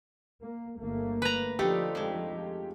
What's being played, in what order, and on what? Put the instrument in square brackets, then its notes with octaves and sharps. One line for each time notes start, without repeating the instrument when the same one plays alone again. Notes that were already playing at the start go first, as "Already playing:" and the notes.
[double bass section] A#3
G1 A3 A#3
[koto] B4 A#5
[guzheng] D3 D#4 [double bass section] F3 [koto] A3 [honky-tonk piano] G4
[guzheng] F2 G#3